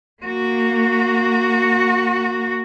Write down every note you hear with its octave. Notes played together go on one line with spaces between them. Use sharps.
A#3 F#4